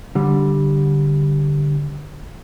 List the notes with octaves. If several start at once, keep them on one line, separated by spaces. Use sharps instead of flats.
D3 G3